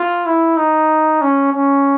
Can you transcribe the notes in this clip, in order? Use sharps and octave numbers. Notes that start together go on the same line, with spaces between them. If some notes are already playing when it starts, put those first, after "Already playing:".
Already playing: F4
E4
D#4
C#4
C#4